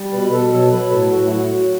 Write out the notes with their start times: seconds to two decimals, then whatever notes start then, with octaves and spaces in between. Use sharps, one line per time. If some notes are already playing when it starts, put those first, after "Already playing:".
Already playing: G3
0.12 B2 B4
0.32 B2 A4
0.52 F#3 A4
0.72 F#3 B4
0.91 A2 A4
1.11 A2 F#4
1.25 E4
1.31 F#3 F#4
1.50 F#3